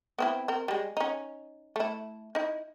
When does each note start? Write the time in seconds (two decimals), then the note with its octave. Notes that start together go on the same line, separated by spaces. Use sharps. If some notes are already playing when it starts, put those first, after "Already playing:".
0.18 B3 C4 E4
0.48 C4 A#4
0.68 G3 G#3
0.97 C#4 D#4
1.76 A3 E4
2.35 D#4 E4